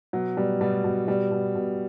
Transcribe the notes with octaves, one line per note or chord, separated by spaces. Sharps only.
B2 F#3
B2 G3
B2 G3
B2
B2 G3
B2
B2